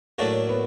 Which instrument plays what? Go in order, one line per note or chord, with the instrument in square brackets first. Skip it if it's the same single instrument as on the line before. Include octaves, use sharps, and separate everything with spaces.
[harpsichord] A2 F#3 A3 D4 F#4 [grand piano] A#3
[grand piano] B3